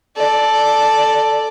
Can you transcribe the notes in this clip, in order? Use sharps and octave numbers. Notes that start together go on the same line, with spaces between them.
A4 D5